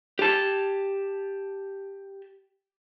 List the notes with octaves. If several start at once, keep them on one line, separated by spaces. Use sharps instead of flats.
G4 A5